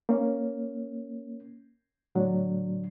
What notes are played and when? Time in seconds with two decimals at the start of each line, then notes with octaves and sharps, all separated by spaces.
0.09 A#3 C#4
2.15 A2 D3 F#3 D4